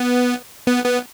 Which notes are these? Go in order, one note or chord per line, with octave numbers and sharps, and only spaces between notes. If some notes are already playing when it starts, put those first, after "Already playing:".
Already playing: B3
B3
B3